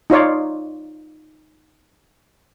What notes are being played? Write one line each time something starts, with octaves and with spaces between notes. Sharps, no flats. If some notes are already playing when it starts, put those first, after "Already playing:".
D#4 F4 C#5 D5